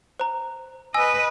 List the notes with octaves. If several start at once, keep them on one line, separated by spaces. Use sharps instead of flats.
C5 A#5
B4 D#5 G#5 E6 A#6